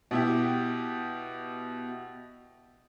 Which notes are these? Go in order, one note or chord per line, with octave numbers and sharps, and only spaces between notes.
B2 E4 G4